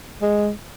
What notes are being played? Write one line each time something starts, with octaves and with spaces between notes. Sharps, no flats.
G#3